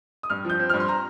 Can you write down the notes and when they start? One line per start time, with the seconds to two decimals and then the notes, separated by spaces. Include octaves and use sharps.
0.23 D#6
0.30 G2 F6
0.45 F3 G6
0.59 C4
0.70 G2 F6
0.80 C6
0.88 A#5